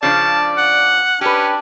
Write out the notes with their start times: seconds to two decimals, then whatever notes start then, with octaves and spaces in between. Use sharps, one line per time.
0.03 C#3 F3 D4 D5 A5
0.58 F#5
1.21 C#4 D4 G4 B4